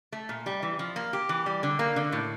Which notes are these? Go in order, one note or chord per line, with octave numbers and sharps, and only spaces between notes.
A3
A#2
G3
E3
F3
A#3
G4
E3
G3
D3
A#3
D3
A2